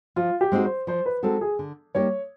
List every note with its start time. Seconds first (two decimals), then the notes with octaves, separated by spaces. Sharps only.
0.16 F3 F4
0.41 G4
0.52 G#3 C4 D#4 F#4
0.64 C5
0.87 F3 C5
1.06 B4
1.23 G#3 C4 D#4 F#4 A4
1.41 G#4
1.59 D3
1.94 G3 A#3 D#4 G4 C#5